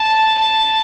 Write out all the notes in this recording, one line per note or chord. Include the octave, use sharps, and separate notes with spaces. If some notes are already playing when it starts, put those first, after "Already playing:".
Already playing: A5
A5